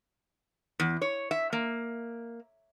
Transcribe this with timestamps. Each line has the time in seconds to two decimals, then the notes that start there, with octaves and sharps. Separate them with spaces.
0.80 E2
1.02 C#5
1.31 E5
1.53 A#3